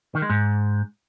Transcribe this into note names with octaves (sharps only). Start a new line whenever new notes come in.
D#3
G#3
G#2